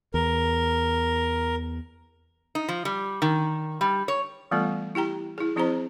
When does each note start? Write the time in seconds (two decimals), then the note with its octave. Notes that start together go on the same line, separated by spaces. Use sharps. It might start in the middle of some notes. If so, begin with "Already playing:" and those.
0.14 E2 A#4
2.55 D#4
2.69 F3
2.85 G3
3.22 D#3
3.81 G3
4.08 C#5
4.51 E3 G3 A3 B3 F4 A4
4.95 E4 G4 G5 A#5
5.38 E4 G#4
5.56 F3 C4 E4 G#4 C5 A#5